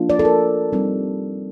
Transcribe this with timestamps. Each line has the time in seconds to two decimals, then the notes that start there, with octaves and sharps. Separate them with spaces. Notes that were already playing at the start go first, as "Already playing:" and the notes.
Already playing: F3 A#3 D4 F4
0.10 D5
0.19 A4
0.25 A#4
0.73 G3 C4 D#4